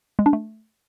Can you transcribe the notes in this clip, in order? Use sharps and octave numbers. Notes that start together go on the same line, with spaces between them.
G#3
D4
A3